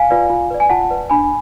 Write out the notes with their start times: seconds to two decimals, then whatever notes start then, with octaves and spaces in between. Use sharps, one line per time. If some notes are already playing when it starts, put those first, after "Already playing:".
Already playing: F5 G#5
0.10 F4 B4 D5
0.30 F4
0.51 B4 D5
0.60 G#5
0.70 F4 F#5 A5
0.90 B4 D5
1.10 D4 G#5 B5